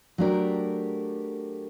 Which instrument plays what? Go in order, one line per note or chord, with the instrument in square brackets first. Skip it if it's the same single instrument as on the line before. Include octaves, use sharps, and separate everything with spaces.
[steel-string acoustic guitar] F#3 A3 D4 G4 A#4